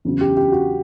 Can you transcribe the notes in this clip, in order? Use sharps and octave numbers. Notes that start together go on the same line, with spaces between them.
E2 C#3 F#3
G4
G4
F#4